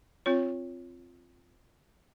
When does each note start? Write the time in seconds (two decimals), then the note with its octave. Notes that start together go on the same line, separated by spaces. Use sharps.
0.26 C4 F4 C#5